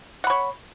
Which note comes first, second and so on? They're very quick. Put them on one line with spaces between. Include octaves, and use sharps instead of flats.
F#5 B5 C#5